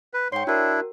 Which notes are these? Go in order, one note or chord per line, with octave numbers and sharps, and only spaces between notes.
B4
G#2 C#5 G5 C6
D4 E4 F#4 A#4